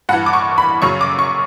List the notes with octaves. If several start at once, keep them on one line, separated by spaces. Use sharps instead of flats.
G2 E3 F#5
D6
C#6
B5
F#2 C#3 F#3 C#6
D6
C#6